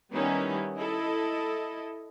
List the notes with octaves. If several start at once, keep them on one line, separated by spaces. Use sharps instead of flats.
D#3 G3 B3 C#4 D#4 E4
E4 A4 D#5